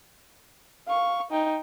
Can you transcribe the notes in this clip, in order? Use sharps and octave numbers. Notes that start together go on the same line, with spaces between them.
F5 C#6
D#4 G5